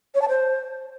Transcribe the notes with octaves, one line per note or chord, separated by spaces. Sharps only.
C#5
A5
C5